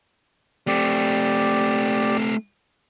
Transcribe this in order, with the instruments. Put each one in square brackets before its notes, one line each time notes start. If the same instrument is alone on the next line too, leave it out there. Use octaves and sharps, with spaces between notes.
[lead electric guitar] A3 C4 [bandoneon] G4 D5